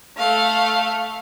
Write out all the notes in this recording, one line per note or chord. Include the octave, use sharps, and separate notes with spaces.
A3 F5